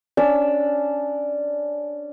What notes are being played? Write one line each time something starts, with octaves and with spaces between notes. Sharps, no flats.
C#4 D4 D5 E6